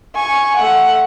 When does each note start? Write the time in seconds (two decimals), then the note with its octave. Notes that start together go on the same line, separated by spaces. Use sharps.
0.15 G#5 C#6
0.56 A3 F#5